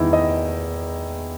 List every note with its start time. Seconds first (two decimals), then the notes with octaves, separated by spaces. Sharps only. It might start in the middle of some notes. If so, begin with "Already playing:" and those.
Already playing: E2 D#3 D#4 E4
0.13 D#5